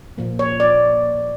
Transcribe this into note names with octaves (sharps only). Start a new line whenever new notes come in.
A#2 F3 A#3
C#5
D5